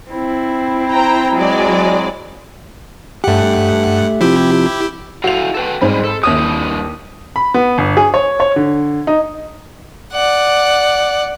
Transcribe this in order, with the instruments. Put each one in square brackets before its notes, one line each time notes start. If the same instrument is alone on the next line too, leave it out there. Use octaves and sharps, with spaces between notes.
[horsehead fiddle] C4 E4
[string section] C5 G5 A#5
F#3 G#3 D5
[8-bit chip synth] G2 F#5 [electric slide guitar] A3 G4
[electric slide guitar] C3 F3 [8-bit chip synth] E4 G4
[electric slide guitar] E4 A4 F5 [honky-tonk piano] F#4 F7
[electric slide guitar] A4 B4 G5
[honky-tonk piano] G#2 C4 B5 [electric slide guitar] G3 G#3
[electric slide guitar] A4
[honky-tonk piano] D#2 D#6 [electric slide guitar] G4 C#5 E5
[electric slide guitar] G2 E4 G4
[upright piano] B5
B3
G1
G#4
C#5
C#5
D3
D#4
[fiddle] D5 F#5